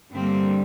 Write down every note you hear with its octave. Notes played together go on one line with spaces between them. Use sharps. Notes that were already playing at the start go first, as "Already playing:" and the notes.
G2 D3 G3 A#3 C4